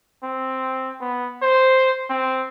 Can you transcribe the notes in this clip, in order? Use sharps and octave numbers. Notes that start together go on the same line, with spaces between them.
C4
B3
C5
C4